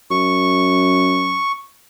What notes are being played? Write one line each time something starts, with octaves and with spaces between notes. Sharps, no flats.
F#2 C#6